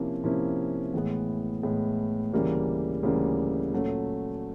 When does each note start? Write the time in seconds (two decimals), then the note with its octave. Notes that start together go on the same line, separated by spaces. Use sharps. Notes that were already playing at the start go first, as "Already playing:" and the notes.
Already playing: C3 F3 A#3 C#4 E4
0.24 C3 F3 A#3 C#4 E4
0.94 A2 E3 G#3 B3
1.63 A2 E3 G#3 B3
2.33 D2 C#3 E3 G3 A#3
3.03 D2 C#3 E3 G3 A#3
3.73 A#2 F#3 A3 C#4